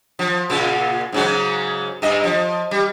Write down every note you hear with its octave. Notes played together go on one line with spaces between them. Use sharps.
F3
A#2 C#3 F4
G#2 C#3 F#3
G2 D#5
F3
G3